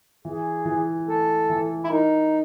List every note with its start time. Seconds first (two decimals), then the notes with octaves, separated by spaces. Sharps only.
0.25 E3 G#4
0.65 E3
1.07 A3 A4
1.50 E3
1.84 E4
1.90 D#4 A#4